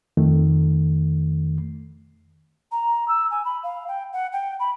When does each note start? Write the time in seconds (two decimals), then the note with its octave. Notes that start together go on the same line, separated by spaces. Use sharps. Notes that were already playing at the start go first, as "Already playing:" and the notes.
0.17 F2 D#3 A3
2.71 A#5
3.08 E6
3.30 G#5
3.44 B5
3.63 F5
3.87 G5
4.13 F#5
4.32 G5
4.59 B5